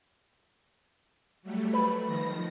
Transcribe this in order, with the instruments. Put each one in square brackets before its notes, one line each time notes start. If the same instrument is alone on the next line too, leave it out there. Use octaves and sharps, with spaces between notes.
[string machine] F#3 G3 A3
[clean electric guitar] B4
[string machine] D#3 F3 A#6